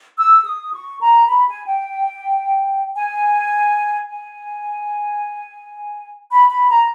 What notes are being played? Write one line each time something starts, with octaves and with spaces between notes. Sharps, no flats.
E6
D#6
C#6
A#5
B5
G#5
G5
G#5
G#5
B5
B5
A#5